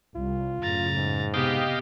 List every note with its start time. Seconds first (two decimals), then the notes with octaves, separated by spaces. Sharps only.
0.16 C2 F4
0.63 F#2 A2 C#3 A#5 A6
0.96 G#2
1.34 C3 B3 G4 D#5 F5 G5